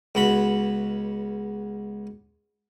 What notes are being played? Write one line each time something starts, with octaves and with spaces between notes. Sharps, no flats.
C#2 B3 F#4 B5